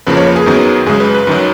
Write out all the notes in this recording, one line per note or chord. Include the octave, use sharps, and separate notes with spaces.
F2 C#3 F3 A#3 B4
C#5
B4
G#4
F#2 D#3 F#3 B3
F#2 C#3 G#3 G#4
B4
B4
F#2 D#3 F#3